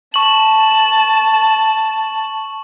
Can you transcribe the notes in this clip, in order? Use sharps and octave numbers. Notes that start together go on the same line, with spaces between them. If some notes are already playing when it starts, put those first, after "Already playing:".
A5 C#6 F#7